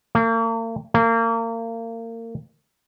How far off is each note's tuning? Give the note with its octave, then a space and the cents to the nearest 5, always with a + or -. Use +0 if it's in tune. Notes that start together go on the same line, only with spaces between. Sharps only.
A#3 -40
A#3 -30